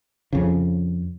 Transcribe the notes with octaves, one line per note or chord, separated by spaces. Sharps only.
F2 C#3